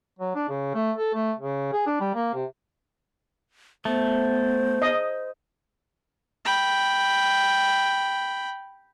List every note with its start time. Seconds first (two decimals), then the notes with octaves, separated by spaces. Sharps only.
0.19 F#3
0.35 D4
0.49 C#3
0.74 A3
0.98 A4
1.14 A3
1.38 C#3
1.73 G#4
1.87 D4
2.00 G3
2.15 A#3
2.34 C3
3.85 A3 B3 C5
4.82 D#5
6.45 G5 B5